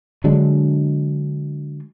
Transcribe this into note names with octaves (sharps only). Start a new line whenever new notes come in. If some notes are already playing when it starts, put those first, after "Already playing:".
D3 F#3 G#3 D4